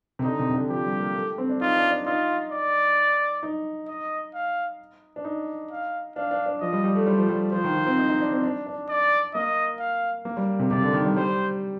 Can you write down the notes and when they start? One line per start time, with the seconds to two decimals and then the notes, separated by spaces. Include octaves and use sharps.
0.19 C3
0.24 D3 D#4
0.39 C3
0.50 C3
0.55 D3
0.70 F3 G4
0.85 G3
1.00 A#3
1.15 A3
1.38 C4
1.49 D4
1.61 D#4 F4
1.76 D4
1.91 D4
2.06 D#4 F4
2.52 D5
3.43 D#4
3.88 D#5
4.34 F5
5.16 D4
5.25 D#4
5.71 F5
6.16 D4 F5
6.31 D4
6.46 D4
6.61 F3 D#5
6.73 G3
6.84 G3
6.95 A3
7.06 G3 C5
7.18 F3
7.29 G3
7.52 F3 C5
7.64 D#3
7.75 F3
7.86 C4
7.98 D#4
8.09 D#4
8.21 D4
8.32 C4
8.43 D4
8.67 D4
8.89 D5
9.34 A#3 D#5
9.79 F5
10.25 A#3
10.37 G3
10.59 C3
10.71 C3 D5
10.82 D3
10.93 D#3
11.05 G3
11.16 G3 C5